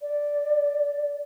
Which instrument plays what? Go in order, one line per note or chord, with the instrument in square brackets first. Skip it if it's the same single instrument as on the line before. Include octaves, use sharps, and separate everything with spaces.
[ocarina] D5